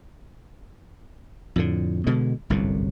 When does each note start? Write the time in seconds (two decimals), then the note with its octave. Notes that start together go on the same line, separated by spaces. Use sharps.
1.56 F2 A2 D3
2.07 B2 D3 G#3
2.50 G1 C2 F#2 A2